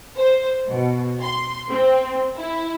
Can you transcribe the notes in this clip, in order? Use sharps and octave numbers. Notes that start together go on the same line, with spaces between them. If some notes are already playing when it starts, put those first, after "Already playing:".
C5
B2
C6
C4
E4